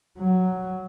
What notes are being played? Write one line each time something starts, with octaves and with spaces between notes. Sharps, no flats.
F#3